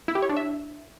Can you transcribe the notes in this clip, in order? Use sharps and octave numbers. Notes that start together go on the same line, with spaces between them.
E4
G4
C#5
D4
E5